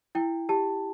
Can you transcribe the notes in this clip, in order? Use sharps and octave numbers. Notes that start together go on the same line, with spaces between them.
E4 G5
G4 A5